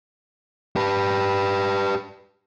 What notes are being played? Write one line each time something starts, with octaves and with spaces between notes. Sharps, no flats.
G4 B4